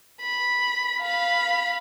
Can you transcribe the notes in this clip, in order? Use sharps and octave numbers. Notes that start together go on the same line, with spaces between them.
B5
F5 B5